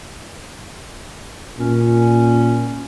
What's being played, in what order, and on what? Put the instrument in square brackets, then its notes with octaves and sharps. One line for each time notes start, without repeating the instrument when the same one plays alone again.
[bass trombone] A#2 [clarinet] C#4